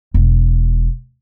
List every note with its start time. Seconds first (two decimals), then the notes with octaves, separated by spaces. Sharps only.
0.14 E1